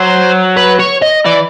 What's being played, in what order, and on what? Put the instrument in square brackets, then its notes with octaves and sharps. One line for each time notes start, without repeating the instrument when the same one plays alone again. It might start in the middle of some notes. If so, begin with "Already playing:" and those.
Already playing: [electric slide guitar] F#3 [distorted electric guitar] C5
[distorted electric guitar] B4
C#5
D#5
[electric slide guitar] E3 [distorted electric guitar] D5